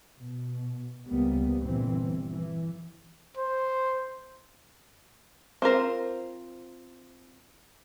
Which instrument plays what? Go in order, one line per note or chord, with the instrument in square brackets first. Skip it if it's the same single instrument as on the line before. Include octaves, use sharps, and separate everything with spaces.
[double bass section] B2
C#2 C3 G3 A#3 B3
G1 A#2 E3 C4
E3
[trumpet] C5
[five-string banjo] C4 F4 A#4 C5